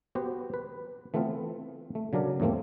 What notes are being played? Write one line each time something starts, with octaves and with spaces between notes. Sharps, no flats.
B3 F#4 G4 C5
B4
E3 A3 B3 C4 F4
A3
C#3 F#3 D4 A#4 D5
E2 G#2 A3 A#3 C4